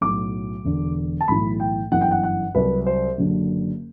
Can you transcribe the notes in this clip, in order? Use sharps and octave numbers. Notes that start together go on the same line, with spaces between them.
B1 A2 F#3 D6
E1 E2 D3
A5
B1 A2 E3 B5
G5
G1 F#2 E3 F#5
G5
F#5
F#5
C2 C3 F#3 B4
C5
F#1 F#2 D3 F#3